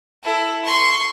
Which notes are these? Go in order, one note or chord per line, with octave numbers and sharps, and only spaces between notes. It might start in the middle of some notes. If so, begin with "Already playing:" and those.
E4 A4
C6 C#6